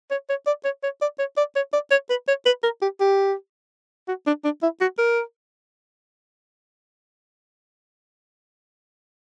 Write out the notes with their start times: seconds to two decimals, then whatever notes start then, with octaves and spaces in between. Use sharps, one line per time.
0.11 C#5
0.29 C#5
0.47 D5
0.64 C#5
0.83 C#5
1.01 D5
1.19 C#5
1.37 D5
1.56 C#5
1.73 D5
1.91 C#5
2.10 B4
2.28 C#5
2.46 B4
2.63 A#4
2.82 G4
3.00 G4
4.08 F#4
4.26 D4
4.44 D4
4.63 E4
4.81 F#4
4.98 A#4